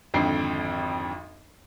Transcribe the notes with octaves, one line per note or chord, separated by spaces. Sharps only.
G#1 F2 D3 G5 C7